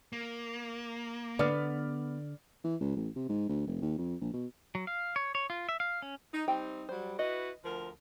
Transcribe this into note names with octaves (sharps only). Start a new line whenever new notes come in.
A#3
D3 B3 D5 F6
E3
C#2
A1
C3
G#2
D2
F1
D#2
F2
A#1
B2
F#3
F5
C#5
C#5
F4
E5
F5
C#4
D#4
G3 C4 D#4 G5
F#3 G3 C5
E4 F#4 B4 D#5
D2 F3 A#4